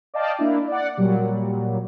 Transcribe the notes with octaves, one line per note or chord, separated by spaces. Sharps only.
D5 D#5 F5 G5 A5
A#3 D4 E4
D5 F#5
A#2 F#3 G3